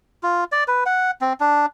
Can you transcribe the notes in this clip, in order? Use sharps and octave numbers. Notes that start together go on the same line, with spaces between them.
F4
D5
B4
F#5
C4
D4